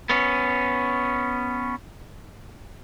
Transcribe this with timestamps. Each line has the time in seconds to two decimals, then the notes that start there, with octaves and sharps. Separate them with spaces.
0.10 B3 C#4